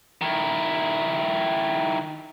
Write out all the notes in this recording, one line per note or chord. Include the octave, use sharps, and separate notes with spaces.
D#3 E4